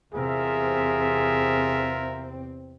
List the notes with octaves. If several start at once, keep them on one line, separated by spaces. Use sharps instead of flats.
E2 C3 C4 F4 G#4 A#4 E5